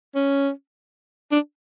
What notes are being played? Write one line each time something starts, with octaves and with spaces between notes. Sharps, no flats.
C#4
D4